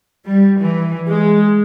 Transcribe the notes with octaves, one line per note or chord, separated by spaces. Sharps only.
G3
E3
G#3